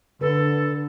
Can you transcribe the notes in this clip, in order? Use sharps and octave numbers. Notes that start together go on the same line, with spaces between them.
D3 A4 B4